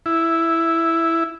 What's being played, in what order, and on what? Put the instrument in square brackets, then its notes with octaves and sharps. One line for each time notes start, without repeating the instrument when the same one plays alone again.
[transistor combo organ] E4